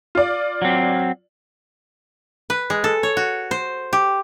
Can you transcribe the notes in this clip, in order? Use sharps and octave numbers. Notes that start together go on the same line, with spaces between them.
F4 D5
F#3 C4
B4
G#3
A4
C#5
F#4
C5
G4